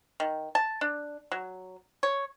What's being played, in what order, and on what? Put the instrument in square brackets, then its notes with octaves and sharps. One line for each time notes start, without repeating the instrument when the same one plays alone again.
[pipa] D#3
A5
D4
F#3
C#5